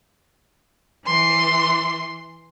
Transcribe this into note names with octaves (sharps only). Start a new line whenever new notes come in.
E3 C6